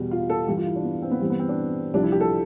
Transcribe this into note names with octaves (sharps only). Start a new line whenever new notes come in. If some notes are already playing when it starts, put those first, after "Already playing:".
Already playing: E2 B2 G3
F4
A4
G2 E3 G3 G4
F4
E4
D4
B3
C4
B3
G2 E3 G3 C4
B3
C4
D4
C2 C3 F3 D4
E4
G4
A4